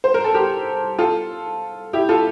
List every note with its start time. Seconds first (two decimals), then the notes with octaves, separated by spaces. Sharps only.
0.04 C5
0.14 A#4
0.24 A4
0.34 G4 A#4
0.99 F4 A4
1.93 E4 G4
2.09 F4 A4